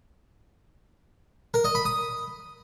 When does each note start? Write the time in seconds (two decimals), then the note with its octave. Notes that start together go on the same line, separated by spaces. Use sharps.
1.54 A#4
1.64 D#5
1.75 B5
1.85 D#6